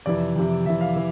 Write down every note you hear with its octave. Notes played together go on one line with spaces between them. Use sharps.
F2 C3 E3 D5
F2 C3 E3
F2 C3 E3 E5
F5
E3